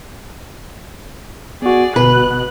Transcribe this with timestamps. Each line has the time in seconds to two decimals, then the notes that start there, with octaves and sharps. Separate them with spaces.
1.62 B3 F#4 G#4 D5
1.96 G1 B2 B4 F#6